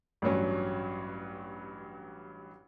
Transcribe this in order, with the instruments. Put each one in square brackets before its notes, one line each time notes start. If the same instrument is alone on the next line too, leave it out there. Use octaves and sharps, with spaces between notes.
[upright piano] A1 G2 F#3 C#4